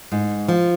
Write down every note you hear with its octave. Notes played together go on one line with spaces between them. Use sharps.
G#2
F3